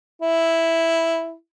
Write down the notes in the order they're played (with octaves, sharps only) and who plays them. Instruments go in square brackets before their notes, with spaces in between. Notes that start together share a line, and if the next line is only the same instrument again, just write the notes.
[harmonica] E4